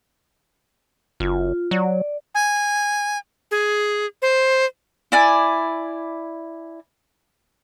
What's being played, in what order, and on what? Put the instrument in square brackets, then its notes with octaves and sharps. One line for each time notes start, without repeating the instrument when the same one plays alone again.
[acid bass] F#1 [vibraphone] F4
[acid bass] F#3 [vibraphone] D5
[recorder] G#5
G#4
C5
[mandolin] E4 D5 G#5